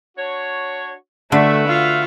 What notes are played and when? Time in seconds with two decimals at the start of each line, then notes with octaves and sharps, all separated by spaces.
0.18 D4 F#4 C#5
1.32 D3 A3 F#4 B4 E5
1.68 F4 F5